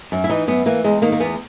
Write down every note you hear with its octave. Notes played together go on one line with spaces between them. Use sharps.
F#2
E4
E3 D#4
F#2 B3
E3 A#3
E2 G#3
D#3 A#3
A#3
E2 B3